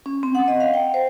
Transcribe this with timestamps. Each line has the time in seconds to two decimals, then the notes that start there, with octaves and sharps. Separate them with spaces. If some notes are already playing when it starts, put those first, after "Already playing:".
0.06 C#4
0.23 C4
0.35 F#5
0.48 D#5
0.60 F5
0.74 G5
0.94 C5